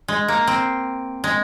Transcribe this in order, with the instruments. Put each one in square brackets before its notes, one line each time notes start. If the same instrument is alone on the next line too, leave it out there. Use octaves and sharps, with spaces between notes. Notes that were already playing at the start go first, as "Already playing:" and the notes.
[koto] G#3
A#3
C4
G#3